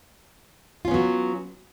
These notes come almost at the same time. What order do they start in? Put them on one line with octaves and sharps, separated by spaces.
F4 C#4 B3 F#3